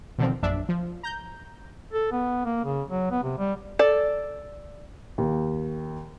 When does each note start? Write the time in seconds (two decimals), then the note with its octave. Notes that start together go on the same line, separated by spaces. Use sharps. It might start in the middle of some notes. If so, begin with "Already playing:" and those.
0.18 B2 D3 D#3 F3 C4
0.43 A#1 F#2 D4 E5
0.69 F3
1.03 A#5 G6
1.93 A4
2.12 B3
2.45 A#3
2.64 C#3
2.88 F#3
3.11 B3
3.23 C3
3.38 G3
3.79 A4 D5
5.18 D#2